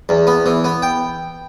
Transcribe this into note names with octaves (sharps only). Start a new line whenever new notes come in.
E2
B3
E3
B3
G5